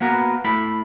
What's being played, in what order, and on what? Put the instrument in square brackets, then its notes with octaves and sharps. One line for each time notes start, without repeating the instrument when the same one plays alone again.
[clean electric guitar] A#3 B3 F#4 A#4 B4
A3 E4 B5